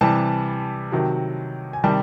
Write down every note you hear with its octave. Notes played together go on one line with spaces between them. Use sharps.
C3 E3 G3 A5
C3 D#3 F#3
G#5
C3 D#3 G3 A5